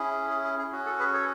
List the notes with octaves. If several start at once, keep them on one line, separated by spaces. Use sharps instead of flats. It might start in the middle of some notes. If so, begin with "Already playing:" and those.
Already playing: C#4 E4 G#4
G#4
G#4
G#4
C#4 F#4
A4
G#4 B4
A4 C#5